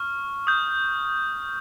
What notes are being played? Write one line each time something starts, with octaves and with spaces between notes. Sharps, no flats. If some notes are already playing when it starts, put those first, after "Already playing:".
Already playing: C#6 F6
D#6 G6